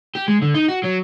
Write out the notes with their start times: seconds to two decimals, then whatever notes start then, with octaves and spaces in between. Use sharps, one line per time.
0.15 G4
0.28 G#3
0.42 D3
0.54 D#4
0.68 F#4
0.84 F#3